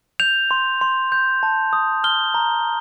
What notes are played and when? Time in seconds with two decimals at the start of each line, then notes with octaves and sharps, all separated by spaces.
0.20 G6 F7
0.51 C6
0.81 C6
1.12 G6
1.43 A5
1.73 D#6
2.04 F6 G7
2.34 A#5